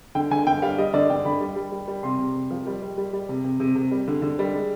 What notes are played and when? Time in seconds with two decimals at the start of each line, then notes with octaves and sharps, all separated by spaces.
0.15 D3 G5
0.31 D3 G#5
0.46 D3 G5
0.62 G3 F5
0.78 G3 D#5
0.94 D3 D5
1.10 D3 G5
1.25 D3 B5
1.40 G3
1.56 G3
1.72 G3
1.88 G3
2.03 C3 C6
2.19 C3
2.35 C3
2.51 F3
2.67 G3
2.82 G3
2.98 G3
3.13 G3
3.29 C3
3.44 C3
3.60 C3
3.75 C3
3.91 G3
4.08 D3
4.22 D3
4.39 G3
4.54 G#3